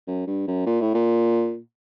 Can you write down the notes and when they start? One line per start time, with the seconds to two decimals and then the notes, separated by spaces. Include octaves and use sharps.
0.08 F#2
0.27 G2
0.47 F#2
0.66 A#2
0.81 A2
0.94 A#2